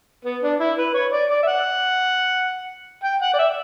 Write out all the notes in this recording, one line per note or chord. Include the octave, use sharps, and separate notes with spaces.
B3
D4
E4
B4
C#5
D5
D5
E5
F#5
G5
F#5
D5
E5